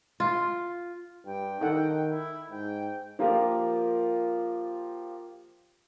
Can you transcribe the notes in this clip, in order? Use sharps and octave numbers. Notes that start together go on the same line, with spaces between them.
F4
G2 G5
D#3 D#4 A4 F#5
E4
G#2 G5
F3 A#3 F4 G4 A#4